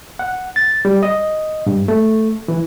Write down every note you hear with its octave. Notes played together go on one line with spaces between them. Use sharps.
F#5
A6
G3
D#5
G2
A3
E3